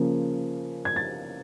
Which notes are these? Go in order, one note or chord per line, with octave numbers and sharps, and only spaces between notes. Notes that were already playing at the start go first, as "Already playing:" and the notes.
Already playing: C#3 F3 A#3
G#6
A6